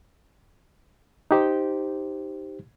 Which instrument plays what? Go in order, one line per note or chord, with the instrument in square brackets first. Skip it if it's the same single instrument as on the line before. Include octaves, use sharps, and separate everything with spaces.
[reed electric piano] D#4 G4 C5